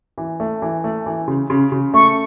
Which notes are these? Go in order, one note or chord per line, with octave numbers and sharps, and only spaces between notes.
E3
A3
E3
A3
E3
C#3
C#3
C#3
A3 C#6